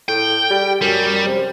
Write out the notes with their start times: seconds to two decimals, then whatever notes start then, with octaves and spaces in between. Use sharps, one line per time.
0.08 A2 G5
0.50 G3
0.81 F#2 G3
1.26 C3